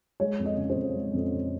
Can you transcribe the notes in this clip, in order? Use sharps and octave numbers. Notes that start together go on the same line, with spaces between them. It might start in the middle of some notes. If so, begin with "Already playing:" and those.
G#3 C#5
F2
D#5
C#3
C5
F2
G#3
F2
C#3